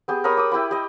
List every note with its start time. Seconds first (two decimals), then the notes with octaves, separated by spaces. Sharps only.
0.08 B3 G4 G#4
0.24 A#4 C#5 B5 D#6
0.37 D6 D#6
0.52 E4 G4 G5 B5
0.71 G4 D#5